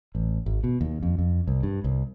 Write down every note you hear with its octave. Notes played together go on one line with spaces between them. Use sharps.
A1
G#1
B2
D#2
F2
F2
C2
G2
C2